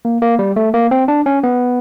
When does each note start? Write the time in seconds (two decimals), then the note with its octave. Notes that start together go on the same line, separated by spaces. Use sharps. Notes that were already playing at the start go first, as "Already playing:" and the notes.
0.05 A#3
0.22 A#3
0.39 G3
0.56 A3
0.74 A#3
0.91 C4
1.08 D4
1.26 C#4
1.43 B3